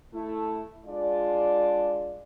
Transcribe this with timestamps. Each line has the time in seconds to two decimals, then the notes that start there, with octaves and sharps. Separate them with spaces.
0.13 A3 E4
0.86 G#3 D4 F4 D5